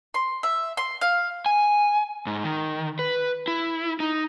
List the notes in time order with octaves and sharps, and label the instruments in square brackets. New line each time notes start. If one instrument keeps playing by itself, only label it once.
[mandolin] C6
E5
C6
F5
[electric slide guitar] G#5
G#2
D#3
B4
E4
D#4